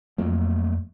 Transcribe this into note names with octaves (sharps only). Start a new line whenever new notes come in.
F2 F#3 A3 A#3